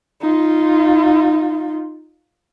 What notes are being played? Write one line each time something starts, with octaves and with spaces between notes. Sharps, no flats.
D#4 F4